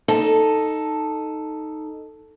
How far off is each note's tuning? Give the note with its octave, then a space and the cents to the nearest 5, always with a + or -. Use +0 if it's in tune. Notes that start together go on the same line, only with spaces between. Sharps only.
D#4 +0 A4 +0